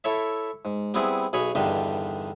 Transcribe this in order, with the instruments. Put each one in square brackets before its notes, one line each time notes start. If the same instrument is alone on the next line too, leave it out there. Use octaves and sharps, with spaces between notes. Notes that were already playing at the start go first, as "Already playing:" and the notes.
[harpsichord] E4 A4 C#5 E5
G#2
G3 B3 C4 E4 G#4
B1 G#4 C#5 B5
E2 G2 D3 D#3 D4 G4